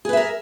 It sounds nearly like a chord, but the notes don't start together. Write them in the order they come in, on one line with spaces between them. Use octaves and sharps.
G#4 B4 E5 A#4